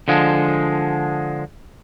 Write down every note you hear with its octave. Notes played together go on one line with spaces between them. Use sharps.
D3 F3 G#3